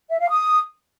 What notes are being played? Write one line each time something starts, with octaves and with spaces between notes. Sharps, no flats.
E5
F5
D#6